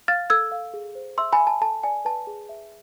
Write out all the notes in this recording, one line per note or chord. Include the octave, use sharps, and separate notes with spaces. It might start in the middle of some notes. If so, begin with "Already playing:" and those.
F5 F6 A6
A4 E6 G#6
F5
G#4
C5
E5 C6 E6
G#5 B5
E5
A5
A4 A5
D5 G#5
B4 A5
G#4
E5